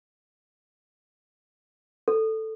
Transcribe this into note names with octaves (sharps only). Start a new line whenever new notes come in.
A4